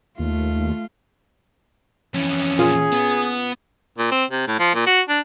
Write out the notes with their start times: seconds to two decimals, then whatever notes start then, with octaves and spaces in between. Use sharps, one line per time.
0.19 D#2 A3 F4
2.14 F2 E3 C#4
2.59 A#2 F4 G#4
2.92 B3
3.98 A#2
4.11 C4
4.30 C3
4.47 A2
4.59 F3
4.75 A#2
4.87 F#4
5.09 D4